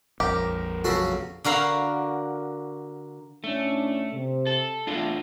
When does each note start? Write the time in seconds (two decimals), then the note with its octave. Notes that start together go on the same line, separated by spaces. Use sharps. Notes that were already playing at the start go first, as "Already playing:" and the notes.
0.20 A#1 F2 G4 A#4
0.84 C#3 F#3 F#4 A4
1.44 D3 F#4 A#4 F5 B5
3.44 A2 A3 C#4 D4
4.11 C3
4.46 A4
4.87 E2 A3 D4 F4